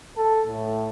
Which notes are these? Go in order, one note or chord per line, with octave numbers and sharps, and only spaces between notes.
A4
A2